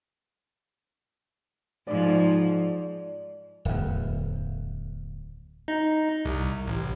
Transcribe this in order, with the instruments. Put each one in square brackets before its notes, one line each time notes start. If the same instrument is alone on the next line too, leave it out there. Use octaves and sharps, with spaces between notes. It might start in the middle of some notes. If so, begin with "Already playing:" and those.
[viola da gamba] G#2 F3 [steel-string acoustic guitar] D5
[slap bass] D1 E2
[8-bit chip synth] D#4
C2
A1